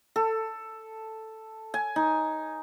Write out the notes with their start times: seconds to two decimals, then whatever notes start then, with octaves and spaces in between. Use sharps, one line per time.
0.16 A4
1.74 G#5
1.96 D#4